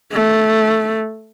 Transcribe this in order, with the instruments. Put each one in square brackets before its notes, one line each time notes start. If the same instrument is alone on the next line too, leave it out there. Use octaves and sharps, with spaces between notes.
[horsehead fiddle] A3